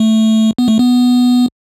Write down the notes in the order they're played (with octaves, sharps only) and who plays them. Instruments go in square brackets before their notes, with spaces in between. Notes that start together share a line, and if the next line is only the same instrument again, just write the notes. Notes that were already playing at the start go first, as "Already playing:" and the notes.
Already playing: [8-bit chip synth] A3
B3
A3
B3